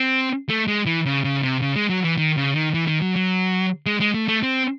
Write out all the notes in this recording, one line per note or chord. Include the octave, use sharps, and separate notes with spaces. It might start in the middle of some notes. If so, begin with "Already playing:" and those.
Already playing: C4
A3
G#3
E3
C#3
C#3
C3
C#3
G#3
F#3
E3
D#3
C#3
D#3
E3
D#3
F#3
F#3
G#3
G#3
A3
A3
C4